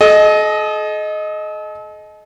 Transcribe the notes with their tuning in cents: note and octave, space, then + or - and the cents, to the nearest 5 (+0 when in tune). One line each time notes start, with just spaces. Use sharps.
A4 -45 D#5 +0